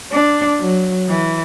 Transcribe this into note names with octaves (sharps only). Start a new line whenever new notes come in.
D4
F#3
E3